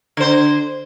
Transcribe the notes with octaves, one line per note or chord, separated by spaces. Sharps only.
D3 C5